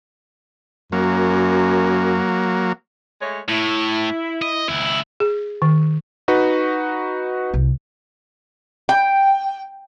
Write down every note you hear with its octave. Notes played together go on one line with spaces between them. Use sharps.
F#2 F#3 A#3
G#3 A3 C#5
A2 E4
D#5
C#2 E4
G#4
D#3
D#4 F#4 B4
C2
G5